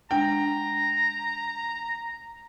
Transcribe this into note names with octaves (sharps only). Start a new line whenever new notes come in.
G#3 D4 F#5 G5 A#5